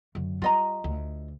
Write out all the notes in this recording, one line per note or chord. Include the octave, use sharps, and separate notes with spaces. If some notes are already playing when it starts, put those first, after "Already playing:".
F#2 D3
G3 F4 D#5 A#5
D2